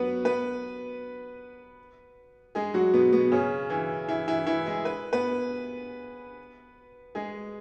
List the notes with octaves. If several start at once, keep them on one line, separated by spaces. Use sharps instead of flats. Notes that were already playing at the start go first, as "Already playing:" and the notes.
Already playing: F#3 B3 F#4 B4
B3 B4
G#3 G#4
F#3 F#4
B2 B3
B2 B3
C#3 C#4
E3 E4
E3 E4
E3 E4
E3 E4
G#3 G#4
B4
B3 B4
G#3 G#4